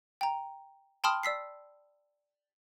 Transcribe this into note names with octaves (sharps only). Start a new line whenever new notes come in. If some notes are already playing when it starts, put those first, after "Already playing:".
G5 A#5
G5 A5 B5 C6 D#6 F6
D5 E6 B6 C7